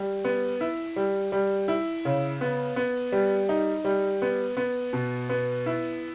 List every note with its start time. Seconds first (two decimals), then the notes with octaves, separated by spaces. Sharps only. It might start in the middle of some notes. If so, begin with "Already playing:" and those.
Already playing: G3
0.24 B3
0.61 E4
0.96 G3
1.32 G3
1.68 E4
2.05 C#3
2.41 B3
2.76 B3
3.12 G3
3.49 D#4
3.85 G3
4.22 B3
4.57 B3
4.93 B2
5.29 B3
5.66 E4